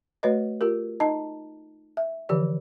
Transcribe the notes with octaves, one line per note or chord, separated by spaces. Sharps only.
A3 F#4 B4 C#5 D#5
F4 G4 A#4
D#4 D#5 A5 A#5
E5
D3 E3 F3 G4 D5